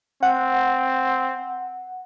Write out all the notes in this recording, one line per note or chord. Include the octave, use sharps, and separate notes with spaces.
C4 F#5